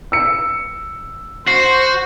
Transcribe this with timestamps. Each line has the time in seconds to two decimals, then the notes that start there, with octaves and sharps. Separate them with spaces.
0.12 E6 C#7
1.47 F#4 C5 C7